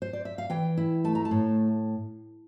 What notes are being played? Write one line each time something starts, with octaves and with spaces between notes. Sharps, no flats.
C5
D5
E5
F5
E3 G5
E4
A3 A5
A#5
A5
A2